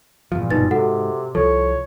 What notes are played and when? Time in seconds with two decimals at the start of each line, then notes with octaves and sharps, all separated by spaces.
0.32 E2 G2 A#2 F3
0.51 F#1 G2 B2 D#4 B4 A6
0.71 G#2 C3 F#4 A4 F#5
1.35 C2 F3 A4 C#5